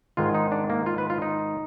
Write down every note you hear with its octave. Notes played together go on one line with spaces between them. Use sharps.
G#2 D#3 G#3 F4
D#4
D4
A#3
F4
B4
F4
D#4